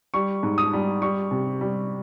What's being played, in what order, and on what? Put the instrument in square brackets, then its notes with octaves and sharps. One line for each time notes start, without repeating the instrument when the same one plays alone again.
[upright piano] G3 C#6
G#2
D#6
G3
G3 C#6
C3
G3